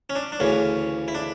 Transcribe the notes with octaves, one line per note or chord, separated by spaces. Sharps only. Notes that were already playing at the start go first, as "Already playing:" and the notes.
C#4
D4
D4
D2 C#3 E3 C#4
E4
D4